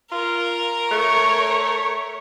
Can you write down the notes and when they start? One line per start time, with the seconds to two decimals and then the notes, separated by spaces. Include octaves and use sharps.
0.12 F4 A#4
0.91 A3 C#5